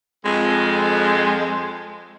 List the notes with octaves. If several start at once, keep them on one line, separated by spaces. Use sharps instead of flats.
F2 G#3